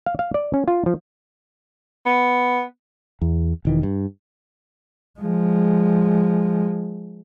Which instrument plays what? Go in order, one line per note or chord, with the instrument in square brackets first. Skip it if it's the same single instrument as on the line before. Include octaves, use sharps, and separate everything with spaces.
[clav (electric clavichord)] F5
F5
D5
C#4
F4
F3
[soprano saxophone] B3
[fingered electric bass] E2
E1 D#3 E3
G2
[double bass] F3 G#3